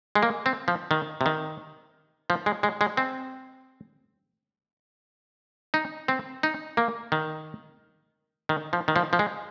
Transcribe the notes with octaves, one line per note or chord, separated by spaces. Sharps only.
G#3
A#3
C4
F3
D#3
C3
D#3
F3
G#3
G#3
G#3
C4
D#4
C4
D#4
A#3
D#3
D#3
F3
D#3
F3
F3
G#3